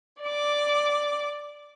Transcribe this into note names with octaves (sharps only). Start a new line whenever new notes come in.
D5 D6